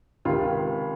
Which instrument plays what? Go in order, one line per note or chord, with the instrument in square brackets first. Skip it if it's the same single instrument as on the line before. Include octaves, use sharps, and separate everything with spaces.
[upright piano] C#2 C3 D#3 F4